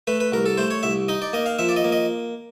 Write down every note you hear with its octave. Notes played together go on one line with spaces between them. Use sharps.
A3 B4
B4
C2 A#4
A4
A3 C5
C#5
C2 E5
D#4 D#5
D5
A#3 D#5
F5
F3 E5
D5
D#5
A#3
D#5